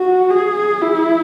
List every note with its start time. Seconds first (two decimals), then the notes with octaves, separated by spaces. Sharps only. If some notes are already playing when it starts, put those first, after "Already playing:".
Already playing: F#4
0.30 G#4
0.81 E4